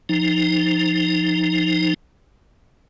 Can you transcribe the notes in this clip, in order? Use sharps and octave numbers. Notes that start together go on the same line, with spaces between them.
F3 D#4